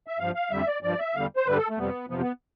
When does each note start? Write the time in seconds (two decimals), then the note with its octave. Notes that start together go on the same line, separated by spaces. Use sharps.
0.07 E5
0.19 G2 F3 F5
0.35 F5
0.51 F2 D3 G3 E5
0.67 D5
0.83 G2 F3 D5
0.99 E5
1.15 E2 D3 G3 F5
1.36 C5
1.46 G2 D3 G3 B4
1.57 A4
1.69 A3
1.78 F2 C3 G3 B3
2.10 F2 C3 F3 B3
2.21 B3